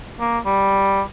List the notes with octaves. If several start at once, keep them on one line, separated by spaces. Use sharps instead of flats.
A#3
G3